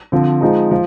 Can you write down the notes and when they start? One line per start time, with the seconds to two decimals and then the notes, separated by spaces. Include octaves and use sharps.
0.12 D3 F3 C4
0.41 F3 G#3 D#4
0.71 F3